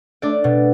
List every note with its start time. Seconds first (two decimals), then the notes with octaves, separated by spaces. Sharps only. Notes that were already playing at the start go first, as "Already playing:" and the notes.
0.22 A3 D4 D5
0.44 B2